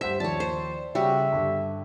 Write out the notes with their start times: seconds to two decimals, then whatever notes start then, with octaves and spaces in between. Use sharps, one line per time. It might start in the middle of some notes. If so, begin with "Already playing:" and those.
0.01 G2 C5 E5 F#5 B6
0.20 D#2 F3 C#5 D5 A5
0.40 C5
0.95 C#3 G3 F#4 E5
1.33 G2 D3